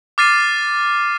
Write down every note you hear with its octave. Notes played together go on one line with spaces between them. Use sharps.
D6 F6 A6 C7 D#7